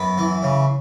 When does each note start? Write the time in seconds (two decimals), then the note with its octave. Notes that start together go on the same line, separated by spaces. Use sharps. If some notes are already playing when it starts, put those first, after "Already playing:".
Already playing: F#2 B3 B5
0.18 E3
0.43 C#3